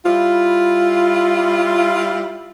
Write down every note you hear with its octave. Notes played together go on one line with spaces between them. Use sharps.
G3 E4 F4